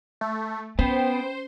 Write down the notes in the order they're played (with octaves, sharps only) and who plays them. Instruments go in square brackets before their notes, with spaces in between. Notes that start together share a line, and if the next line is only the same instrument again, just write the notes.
[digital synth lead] A3
[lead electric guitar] B3 [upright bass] C#4 [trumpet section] B4 G5 [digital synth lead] C5